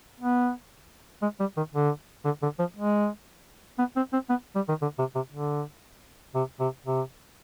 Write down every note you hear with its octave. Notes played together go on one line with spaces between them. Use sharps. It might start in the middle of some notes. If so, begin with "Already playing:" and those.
B3
G#3
G3
D#3
D3
D3
D3
F3
G#3
B3
C4
C4
B3
G3
D#3
D3
C3
C3
D3
C3
C3
C3